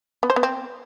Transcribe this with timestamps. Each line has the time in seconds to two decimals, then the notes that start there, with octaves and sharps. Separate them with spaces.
0.23 B3
0.30 C5
0.36 B3
0.43 C4